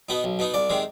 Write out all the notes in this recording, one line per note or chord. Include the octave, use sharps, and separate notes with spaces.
B2 B3 D#4
B1
B2 B3 D#4
C2 D5
C3 D#3 G#3